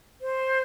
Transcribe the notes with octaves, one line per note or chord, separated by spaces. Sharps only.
C5